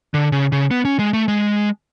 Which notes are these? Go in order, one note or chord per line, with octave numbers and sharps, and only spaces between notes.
D3
C#3
C#3
B3
C#4
G#3
A3
G#3